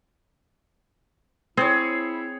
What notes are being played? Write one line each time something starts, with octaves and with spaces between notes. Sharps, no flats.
C4 E4 G#4 C#5